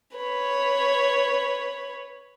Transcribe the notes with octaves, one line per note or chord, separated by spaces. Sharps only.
B4 C#5